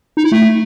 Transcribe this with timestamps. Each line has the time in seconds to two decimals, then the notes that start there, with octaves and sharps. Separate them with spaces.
0.17 D#4
0.24 E4
0.32 A3